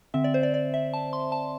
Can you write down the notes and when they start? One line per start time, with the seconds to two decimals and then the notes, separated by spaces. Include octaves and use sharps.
0.14 D3 C4 E5
0.24 D5
0.34 C5
0.43 D5
0.54 D5
0.74 E5
0.93 A5
1.13 C6
1.32 A5